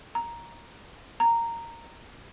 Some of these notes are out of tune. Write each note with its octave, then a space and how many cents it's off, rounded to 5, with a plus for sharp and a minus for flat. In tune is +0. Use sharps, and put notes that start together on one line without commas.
A#5 +5
A#5 -10